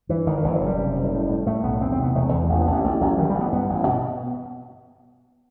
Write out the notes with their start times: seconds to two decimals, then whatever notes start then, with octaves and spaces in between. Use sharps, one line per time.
0.09 G2 E3
0.26 G1 D#3
0.37 D#3
0.43 F#1 E3
0.55 F#3
0.61 F#1
0.67 G3
0.78 C3
0.96 F#1
1.12 A2
1.29 A2
1.46 A2 A3
1.63 B1 B3
1.81 E2 C4
1.92 C4
1.98 C3
2.03 B3
2.15 E1 A3
2.32 E2
2.50 A1 A3
2.61 B3
2.67 A1
2.73 B3
2.84 A1 A3
3.01 A1 F#3
3.18 G2 D#3
3.30 G3
3.35 A1
3.41 B3
3.52 G2 B3
3.69 A1
3.87 B2